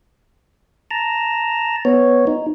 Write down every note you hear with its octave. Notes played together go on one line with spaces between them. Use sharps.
A5 A#5
B3 C#5
D#4